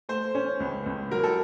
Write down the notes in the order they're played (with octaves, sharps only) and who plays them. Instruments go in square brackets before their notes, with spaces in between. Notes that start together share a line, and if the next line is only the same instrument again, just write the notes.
[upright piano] A3 [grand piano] C5
[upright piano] C#4
C#2
C#2
[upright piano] F#3 [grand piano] A#4
[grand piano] A4